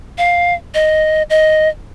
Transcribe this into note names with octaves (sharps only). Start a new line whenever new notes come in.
F5
D#5
D#5